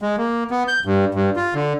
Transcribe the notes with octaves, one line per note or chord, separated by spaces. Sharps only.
G#3
A#3
B3
G6
G2
G2
F4
D3